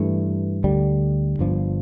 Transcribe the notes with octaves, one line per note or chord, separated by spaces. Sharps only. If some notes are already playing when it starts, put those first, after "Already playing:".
Already playing: G2 E3 A3
D2 D3 G3
G1 G2 F3